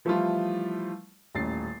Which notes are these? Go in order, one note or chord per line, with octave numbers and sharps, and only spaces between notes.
E3 F3 G3 A3 E4 F4
D#1 A1 A6 C7